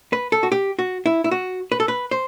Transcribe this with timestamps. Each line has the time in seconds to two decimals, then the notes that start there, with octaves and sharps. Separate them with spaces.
0.13 B4
0.32 A4
0.43 F#4
0.52 G4
0.79 F#4
1.06 E4
1.24 E4
1.31 F#4
1.72 B4
1.80 A4
1.88 B4
2.11 C5